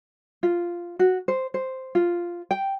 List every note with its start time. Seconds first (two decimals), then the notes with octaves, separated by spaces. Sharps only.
0.43 F4
0.99 F#4
1.28 C5
1.54 C5
1.95 F4
2.51 G5